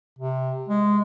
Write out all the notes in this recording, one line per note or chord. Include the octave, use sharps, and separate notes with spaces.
C3
G#3